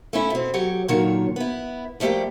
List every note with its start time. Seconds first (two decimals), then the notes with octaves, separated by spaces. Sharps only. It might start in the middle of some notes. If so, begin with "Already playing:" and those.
0.13 A3 C#4 E4
0.30 B2 C4
0.54 F#3 G4 C#5
0.88 A#2 D3 D#3 F#3 C#5
1.36 B3 E4
2.00 F3 G3 A3 A#3 G4